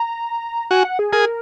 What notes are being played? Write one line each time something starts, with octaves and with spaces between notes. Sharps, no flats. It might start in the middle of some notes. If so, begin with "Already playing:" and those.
Already playing: A#5
F#4 G#5
F#5
G#4
G#4 A#4